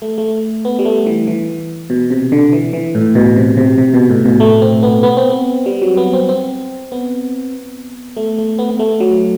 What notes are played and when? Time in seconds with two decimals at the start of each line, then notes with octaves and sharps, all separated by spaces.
0.02 A3
0.18 A3
0.65 B3
0.79 G3
0.85 A3
1.06 E3
1.27 E3
1.90 B2
2.11 C3
2.32 D3
2.53 E3
2.73 E3
2.95 A2
3.15 B2
3.36 C3
3.57 C3
3.78 C3
3.94 B2
4.10 A2
4.25 B2
4.40 A3
4.62 C4
4.83 B3
5.03 B3
5.17 C4
5.30 B3
5.66 G3
5.82 F#3
5.97 B3
6.13 C4
6.29 C4
6.92 B3
8.17 A3
8.38 A3
8.59 B3
8.70 B3
8.79 A3
9.00 F#3